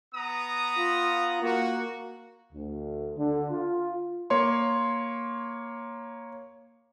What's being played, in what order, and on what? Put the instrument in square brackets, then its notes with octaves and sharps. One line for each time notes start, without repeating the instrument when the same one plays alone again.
[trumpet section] B3 A#5 D#6
[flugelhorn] F4
[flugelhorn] A#3 [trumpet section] F#4
[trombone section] D2
D3
F4
[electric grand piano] A#3 C#5 C6